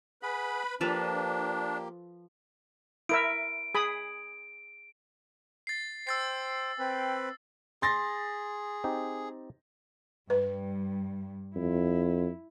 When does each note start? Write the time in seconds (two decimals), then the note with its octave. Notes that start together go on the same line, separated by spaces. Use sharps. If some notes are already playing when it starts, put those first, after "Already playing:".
0.22 G#4 B4 F#5 B5
0.81 F3 A#3 D4 G4 A4 B4
3.09 E4 A#4 E5 D7
3.75 G#4 B5 D#6
5.67 A6 C7
6.07 C5 G5 E6 A6 C7
6.79 C4 B4 G5
7.82 G#4 C6 A6 A#6
8.84 C4 D#4 G4
10.30 G2 G3 B4
11.56 F2 E4